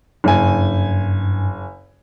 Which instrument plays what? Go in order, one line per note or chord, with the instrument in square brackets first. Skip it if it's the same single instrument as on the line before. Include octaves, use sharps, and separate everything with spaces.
[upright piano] F#1 G#5 [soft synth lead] G2